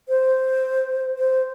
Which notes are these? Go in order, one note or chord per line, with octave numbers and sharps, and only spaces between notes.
C5
C5